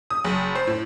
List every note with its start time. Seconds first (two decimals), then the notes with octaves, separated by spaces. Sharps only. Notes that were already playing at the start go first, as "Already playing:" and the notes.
0.10 D#6
0.24 F#1
0.55 C5
0.67 A2